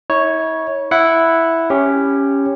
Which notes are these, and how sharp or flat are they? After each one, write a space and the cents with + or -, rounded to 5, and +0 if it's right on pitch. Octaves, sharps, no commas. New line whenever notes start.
E4 -45 C#5 +0
E4 +0 F#5 +0
C#4 +0 G4 +15